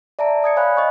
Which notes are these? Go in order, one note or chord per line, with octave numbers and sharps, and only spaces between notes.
D5 E5 A5 A#5 D7
D5 D#6 G#6 C#7
C#5 F5 G#5 B5 F#6
D#5 C#6